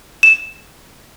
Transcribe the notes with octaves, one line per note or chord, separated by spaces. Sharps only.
E7